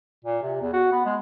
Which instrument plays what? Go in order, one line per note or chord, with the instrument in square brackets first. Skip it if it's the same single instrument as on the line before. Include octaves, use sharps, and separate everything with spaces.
[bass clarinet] A#2
C3
E2
F#4
B3
G#3